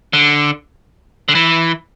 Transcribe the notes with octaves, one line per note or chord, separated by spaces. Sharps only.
D3
D3
E3